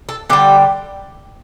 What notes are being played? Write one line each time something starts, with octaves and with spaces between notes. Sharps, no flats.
A4
D3 G3 G4